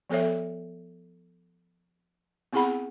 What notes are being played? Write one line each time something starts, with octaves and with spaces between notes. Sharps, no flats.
F3 B3 A4 C#5 E5
B3 C4 E4 G#4 F#5 B5